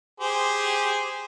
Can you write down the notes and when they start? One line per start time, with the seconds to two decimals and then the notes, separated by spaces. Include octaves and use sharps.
0.20 G4 G#4 C5